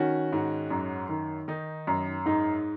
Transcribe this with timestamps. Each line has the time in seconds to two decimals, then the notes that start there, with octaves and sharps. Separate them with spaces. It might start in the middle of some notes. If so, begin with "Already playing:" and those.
Already playing: D#3 C#4 F#4
0.32 G#2
0.70 F#2
1.09 D#3
1.48 D#3 D#4
1.87 F#2
2.26 G#2 D#4